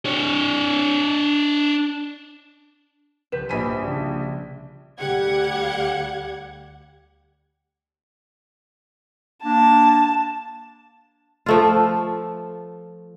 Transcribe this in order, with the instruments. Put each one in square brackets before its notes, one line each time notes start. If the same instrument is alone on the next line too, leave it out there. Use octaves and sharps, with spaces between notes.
[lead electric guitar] D4 C#5
[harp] C2 C3 F3 [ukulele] B4 [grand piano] G6 B6 E7
[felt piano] A#1 B6 D#7 [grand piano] C5 G#5 B5
[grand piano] C#3 D4 [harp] F#4
[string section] D2 G3 G4 F#5 G#6
[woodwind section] A#3 D4 [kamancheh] A5
[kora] F3 A3 F4